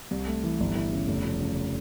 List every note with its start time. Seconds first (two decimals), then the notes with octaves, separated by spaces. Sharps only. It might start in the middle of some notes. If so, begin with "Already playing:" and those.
0.11 C2
0.27 A3
0.44 E3
0.60 G1
0.75 E3
0.92 C#3
1.08 F1
1.24 F3
1.41 C#3